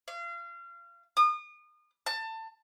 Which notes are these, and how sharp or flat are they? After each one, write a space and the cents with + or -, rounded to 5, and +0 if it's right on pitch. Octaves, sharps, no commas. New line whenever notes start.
F5 -30
D#6 -35
A5 +25